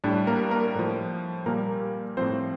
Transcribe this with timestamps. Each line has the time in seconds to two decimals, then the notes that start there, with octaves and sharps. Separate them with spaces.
0.04 A2 G3 D4
0.27 A#3 A#4
0.51 A#3 A#4
0.75 A2 F3
1.46 A#2 G3 A#3 A#4
2.17 A2 F3 C4 C5